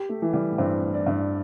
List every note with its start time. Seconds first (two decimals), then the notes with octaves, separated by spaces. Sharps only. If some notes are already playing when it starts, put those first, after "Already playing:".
Already playing: G4
0.09 A3
0.22 E3
0.33 G3
0.51 A2
0.58 G2 C4
0.82 A2
0.94 D5
1.07 G2